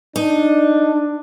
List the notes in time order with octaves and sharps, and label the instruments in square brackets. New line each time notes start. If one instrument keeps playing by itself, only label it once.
[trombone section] D4 [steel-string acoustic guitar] D#4